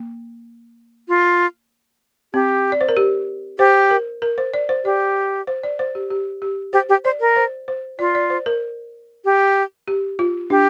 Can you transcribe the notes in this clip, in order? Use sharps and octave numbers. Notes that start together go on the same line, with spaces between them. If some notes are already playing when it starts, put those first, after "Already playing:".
Already playing: A#3
F4
C4 G4
D5
C5
A#4
G4
G4 C5
A#4
A#4
C5
D5
C5
G4 D5
C5
D5
C5
G4
G4
G4
G4 C5
G4
C5 D5
A#4
C5
C5
F4 D5
D5
C5
A#4
G4
G4
F4
D4 G4